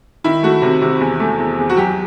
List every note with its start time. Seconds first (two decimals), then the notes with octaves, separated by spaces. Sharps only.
0.24 D#3 E4
0.43 A3 F#4
0.62 C3
0.82 C3
1.00 E2
1.20 A3
1.39 E2
1.59 E2
1.69 F#4
1.77 F#3 G4